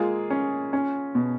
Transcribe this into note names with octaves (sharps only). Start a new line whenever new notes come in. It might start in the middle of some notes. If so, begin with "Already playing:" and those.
Already playing: G#3 A#3 F4 G#4
C#4
C#4
B2